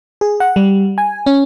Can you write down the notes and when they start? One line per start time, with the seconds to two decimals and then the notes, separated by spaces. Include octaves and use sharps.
0.21 G#4
0.40 F#5
0.56 G3
0.98 G#5
1.26 C#4